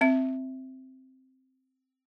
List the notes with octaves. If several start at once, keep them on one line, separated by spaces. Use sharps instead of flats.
C4 E5